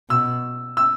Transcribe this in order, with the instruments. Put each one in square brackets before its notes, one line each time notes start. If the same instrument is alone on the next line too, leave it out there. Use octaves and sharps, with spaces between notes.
[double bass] B2 [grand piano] E6
[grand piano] E6